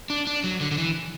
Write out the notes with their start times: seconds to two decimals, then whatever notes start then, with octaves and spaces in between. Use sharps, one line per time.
0.10 D4
0.27 D4
0.44 F#3
0.61 D3
0.71 D3
0.78 E3